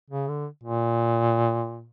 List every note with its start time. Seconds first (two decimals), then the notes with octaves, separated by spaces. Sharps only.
0.10 C#3
0.28 D3
0.64 A#2